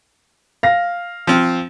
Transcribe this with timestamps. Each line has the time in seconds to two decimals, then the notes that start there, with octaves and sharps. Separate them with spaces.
0.63 F5 A#6
1.27 F3 C4